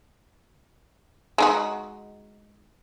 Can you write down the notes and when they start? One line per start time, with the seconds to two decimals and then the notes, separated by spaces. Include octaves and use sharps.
1.38 G#3 D#4 F#4